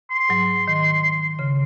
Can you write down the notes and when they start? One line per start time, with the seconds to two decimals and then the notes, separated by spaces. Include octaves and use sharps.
0.10 C6
0.29 G#2 F#3
0.68 D#3
1.39 C#3